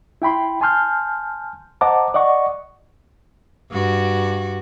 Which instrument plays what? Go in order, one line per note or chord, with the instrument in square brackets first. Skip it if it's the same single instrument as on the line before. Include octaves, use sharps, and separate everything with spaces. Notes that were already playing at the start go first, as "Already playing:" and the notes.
[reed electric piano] E4 G5 B5 C6
G#5 A5 C6 F6 G6
C5 D#5 F#5 A5 A#5 D6
D5 D#5 F#5 C#6
[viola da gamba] G2 F#4